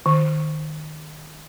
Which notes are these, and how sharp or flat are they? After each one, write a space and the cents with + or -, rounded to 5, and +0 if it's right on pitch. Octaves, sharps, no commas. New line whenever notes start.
D#3 -15